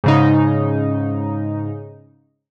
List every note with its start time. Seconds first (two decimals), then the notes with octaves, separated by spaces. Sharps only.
0.04 G#2 C#3 D#4